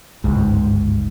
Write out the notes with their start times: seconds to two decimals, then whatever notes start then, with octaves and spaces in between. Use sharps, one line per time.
0.24 G1 C#2 G#2